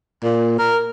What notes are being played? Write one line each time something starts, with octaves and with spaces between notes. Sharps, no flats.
A#2
A#4